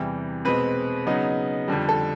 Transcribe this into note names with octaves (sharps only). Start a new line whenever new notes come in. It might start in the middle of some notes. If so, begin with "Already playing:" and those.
Already playing: E2 C3 E3 G3
B2 G#3 C4 B4
C#3 F#3 B3 D#4
F2 D3 G3
A4